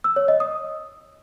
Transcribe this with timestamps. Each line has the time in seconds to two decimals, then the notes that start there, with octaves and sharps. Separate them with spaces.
0.04 E6
0.16 C#5
0.28 D#5
0.40 D#6